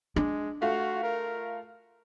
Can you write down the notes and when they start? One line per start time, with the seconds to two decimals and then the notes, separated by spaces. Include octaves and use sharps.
0.16 G#3 D4
0.62 A3 F4 F#4
1.03 A#4